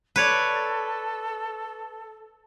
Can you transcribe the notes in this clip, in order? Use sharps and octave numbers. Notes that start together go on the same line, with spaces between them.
A4 B4 C#5 D5